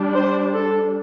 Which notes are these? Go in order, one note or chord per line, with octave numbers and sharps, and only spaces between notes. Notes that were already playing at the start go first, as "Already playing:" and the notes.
Already playing: G3 D4
C5
A4